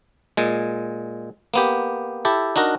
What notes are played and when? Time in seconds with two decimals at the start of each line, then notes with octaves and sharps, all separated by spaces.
0.37 A#2 G#3
1.54 A#3 B3 G4
2.25 E4 G4 A4
2.56 D4 D#4 F#4 A#4